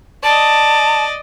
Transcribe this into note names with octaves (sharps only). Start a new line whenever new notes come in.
D5 D#5 A5